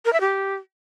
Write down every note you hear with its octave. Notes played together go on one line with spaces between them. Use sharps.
A#4
E5
G4